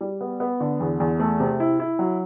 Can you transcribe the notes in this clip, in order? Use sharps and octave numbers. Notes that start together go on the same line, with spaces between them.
G3
B3
B3
D3
E2
E2
A3
C3
E4
E4
F#3